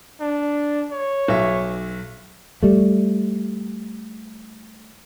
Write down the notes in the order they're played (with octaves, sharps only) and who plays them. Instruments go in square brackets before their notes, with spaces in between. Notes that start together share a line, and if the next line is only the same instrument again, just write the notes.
[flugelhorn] D4
C#5
[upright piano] B1 E5
[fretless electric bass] G3 A3